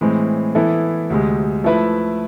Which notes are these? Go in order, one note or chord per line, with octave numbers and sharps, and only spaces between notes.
A2 E3 G#3 C4
E3 B3 E4 A4
D2 C3 G#3
F3 A3 E4 B4 E5